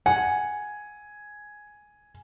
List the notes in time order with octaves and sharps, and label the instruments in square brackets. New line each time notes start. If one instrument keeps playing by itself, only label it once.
[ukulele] F#5 [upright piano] G#5